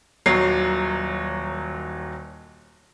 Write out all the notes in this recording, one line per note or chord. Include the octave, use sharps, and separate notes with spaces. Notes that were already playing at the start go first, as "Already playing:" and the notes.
D#1 D#3 F#3 A#5 C7